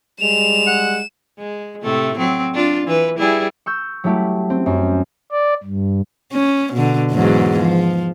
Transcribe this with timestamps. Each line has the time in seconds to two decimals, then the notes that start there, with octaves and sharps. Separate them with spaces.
0.21 G3 G#3 E7 F7
0.67 F#5
1.38 G#3
1.82 A2 C3 A3
2.18 F#3 C4
2.54 D4 F4
2.87 E3 B4
3.18 G3 E4 G#4
3.66 C#6 E6 G6
4.04 F#3 G3 A3 E4 G4
4.50 C4
4.66 F#2
5.32 D5
5.64 G2
6.33 C#4
6.73 B2 D3
7.11 E2 G#2 F#3
7.60 F3